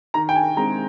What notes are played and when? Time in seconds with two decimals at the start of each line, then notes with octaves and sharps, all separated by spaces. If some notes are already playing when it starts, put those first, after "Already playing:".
0.14 D#3 A#5
0.29 G5
0.36 G#5
0.57 G#3 C4 A#5